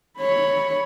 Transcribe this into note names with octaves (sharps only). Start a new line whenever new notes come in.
C#5 B5